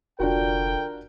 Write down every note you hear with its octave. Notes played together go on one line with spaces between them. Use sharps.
F1 D3 D4 F4 F#4 A#4 G5